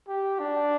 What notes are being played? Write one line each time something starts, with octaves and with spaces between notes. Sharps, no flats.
G4
D4